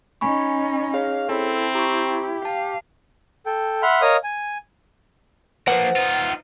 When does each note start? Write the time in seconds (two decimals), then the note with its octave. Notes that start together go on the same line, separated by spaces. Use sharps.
0.21 C#4 D#4 G#5 B5 C#6
0.94 G#4 C#5 F5
1.29 C4 E4 A4
1.75 G4 A#5 C#6
2.45 F5 A5
3.46 A4 G5
3.82 E5 F#5 B5 C6 F6
4.02 A#4 C#5 D#5 F5 D#6
4.24 G#5
5.68 F3 A#3 B4 C5 F#5
5.96 D#4 F4